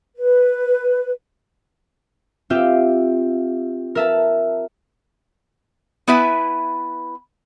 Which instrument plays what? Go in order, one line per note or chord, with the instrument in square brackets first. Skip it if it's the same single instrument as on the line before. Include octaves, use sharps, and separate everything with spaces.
[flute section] B4
[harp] C4 F4 G4 E5 G5
A#4 E5 A5
[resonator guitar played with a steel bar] B3 E4 B4 E5 G#5